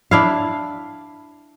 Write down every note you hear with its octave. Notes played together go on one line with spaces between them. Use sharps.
D4 E4 F5